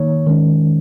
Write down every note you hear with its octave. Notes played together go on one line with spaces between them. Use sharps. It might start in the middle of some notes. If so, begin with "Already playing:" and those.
Already playing: D#3 A#3 D#4 C#5
D#3 G#3 C#4